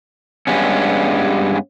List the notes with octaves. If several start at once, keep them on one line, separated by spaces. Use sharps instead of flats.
G2 G3 G#3 B3 C#4